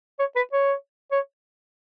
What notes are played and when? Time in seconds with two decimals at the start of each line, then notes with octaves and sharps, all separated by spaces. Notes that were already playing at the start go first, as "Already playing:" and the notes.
0.19 C#5
0.36 B4
0.53 C#5
1.12 C#5